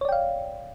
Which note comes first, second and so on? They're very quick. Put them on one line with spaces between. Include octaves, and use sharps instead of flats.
C#5 D5 G5 F5